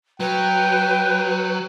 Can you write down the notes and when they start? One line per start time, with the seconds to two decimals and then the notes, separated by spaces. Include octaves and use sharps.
0.20 F#3 B4 G5